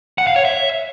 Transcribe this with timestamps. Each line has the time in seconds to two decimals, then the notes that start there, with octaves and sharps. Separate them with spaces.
0.18 F#5
0.27 F5
0.36 C#5
0.45 E5